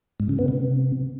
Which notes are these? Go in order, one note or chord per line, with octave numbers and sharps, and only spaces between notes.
G#2
C#3
B3
C3